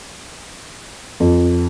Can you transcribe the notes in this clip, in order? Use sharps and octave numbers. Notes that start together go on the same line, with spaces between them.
F2